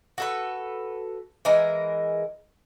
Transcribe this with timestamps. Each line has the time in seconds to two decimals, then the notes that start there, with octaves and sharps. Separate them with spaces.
0.18 F#4 A4 B4
1.45 E3 G#3 A#4